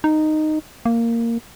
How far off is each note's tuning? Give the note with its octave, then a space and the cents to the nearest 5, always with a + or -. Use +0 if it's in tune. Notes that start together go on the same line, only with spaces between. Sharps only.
D#4 -10
A#3 -10